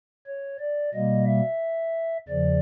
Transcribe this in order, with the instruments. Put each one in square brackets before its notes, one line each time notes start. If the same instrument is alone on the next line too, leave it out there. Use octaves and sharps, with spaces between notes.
[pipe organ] C#5
D5
B2 G3 A#3 D#5
E5
E2 C#3 F3 D5